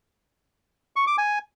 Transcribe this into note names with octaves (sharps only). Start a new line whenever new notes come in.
C#6
D6
G#5